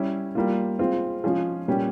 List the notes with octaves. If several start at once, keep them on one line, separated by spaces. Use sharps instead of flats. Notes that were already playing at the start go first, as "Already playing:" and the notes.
Already playing: G3 C#4 E4
G3 A#3 F4
G#3 C4 F4
F3 G#3 C#4 F4 G#4
A#2 G3 C#4 G4